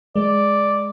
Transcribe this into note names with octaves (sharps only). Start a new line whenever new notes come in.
G#3 D5